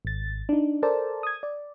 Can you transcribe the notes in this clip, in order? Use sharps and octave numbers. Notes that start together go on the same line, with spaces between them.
G#1 A6
D4 D#4
A4 A#4 C5 D5 A5
D#6 G#6
D5